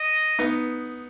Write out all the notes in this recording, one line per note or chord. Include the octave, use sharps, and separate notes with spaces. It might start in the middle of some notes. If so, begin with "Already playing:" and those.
Already playing: D#5
B3 D#4